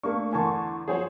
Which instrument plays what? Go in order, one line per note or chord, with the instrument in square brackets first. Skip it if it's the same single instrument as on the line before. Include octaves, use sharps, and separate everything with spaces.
[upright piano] A3 A#3 D4 [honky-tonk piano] C#6
[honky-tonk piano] E2 D3 C#6 [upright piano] G#5 A5 C6
[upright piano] F3 F#3 [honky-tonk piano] G#4 C5 C#5